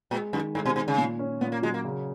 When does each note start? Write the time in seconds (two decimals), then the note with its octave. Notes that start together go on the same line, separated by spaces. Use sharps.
0.11 A#2 G#3
0.33 F#2 D#3
0.55 G#2 G#3
0.66 B2
0.76 B2 D#3
0.88 C#3
0.98 A#2
1.19 C#4
1.41 A#2 B3
1.52 A#3
1.62 F#3 G#3
1.74 A#3
1.84 C#3